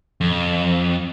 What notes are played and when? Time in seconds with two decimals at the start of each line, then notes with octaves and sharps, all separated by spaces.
0.21 F2